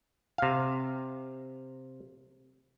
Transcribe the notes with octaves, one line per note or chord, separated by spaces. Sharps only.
C3 F5